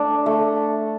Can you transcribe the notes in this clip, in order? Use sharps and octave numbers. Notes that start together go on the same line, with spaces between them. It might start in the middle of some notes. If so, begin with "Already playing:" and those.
Already playing: A3 D4
A3